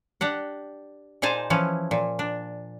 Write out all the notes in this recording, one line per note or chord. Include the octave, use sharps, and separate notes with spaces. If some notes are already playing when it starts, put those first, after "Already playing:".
D4 G4 F#5
A#2 D#4 G#4 C5 A5
E3 F3 C#4
A#2
D4